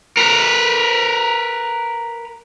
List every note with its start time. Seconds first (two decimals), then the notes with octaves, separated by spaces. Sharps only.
0.17 A#4 B4